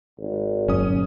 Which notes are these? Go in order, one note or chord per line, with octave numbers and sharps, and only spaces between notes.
G#1
G1 A#2 F#3 C#4 D#6